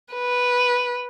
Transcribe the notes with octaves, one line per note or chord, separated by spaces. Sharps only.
B4